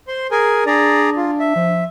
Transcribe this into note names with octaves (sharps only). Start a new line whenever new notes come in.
C5 C6
G#4 A#4 G#5
D4 G#4 D5 A#5
F4
E5
F3